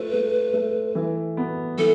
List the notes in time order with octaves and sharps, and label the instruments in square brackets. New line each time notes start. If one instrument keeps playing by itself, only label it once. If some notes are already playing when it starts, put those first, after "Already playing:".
Already playing: [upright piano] A3 F4 [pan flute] B4
[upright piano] A3
A3
E3
B3
[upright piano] E3 [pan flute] A4